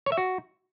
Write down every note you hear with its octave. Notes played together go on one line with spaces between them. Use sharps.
C#5
E5
F#4